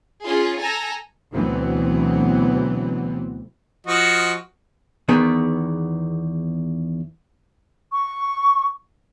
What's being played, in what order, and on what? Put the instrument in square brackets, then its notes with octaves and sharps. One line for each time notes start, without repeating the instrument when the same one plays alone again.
[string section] C#4 F4 G#4
A4 G#5 A#5
[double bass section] D2 B2 E3 F#3 B3 C4
[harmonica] F3 F#4 D#5
[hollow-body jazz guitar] E2 D#3 B3 G#4
[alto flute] C#6